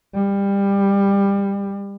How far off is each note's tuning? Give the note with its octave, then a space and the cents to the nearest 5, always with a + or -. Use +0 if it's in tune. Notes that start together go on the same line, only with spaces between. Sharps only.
G3 +20